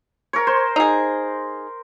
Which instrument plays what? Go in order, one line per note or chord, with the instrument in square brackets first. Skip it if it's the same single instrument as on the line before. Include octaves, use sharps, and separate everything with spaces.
[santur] A#4 C#5
C5
[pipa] D#4 G#4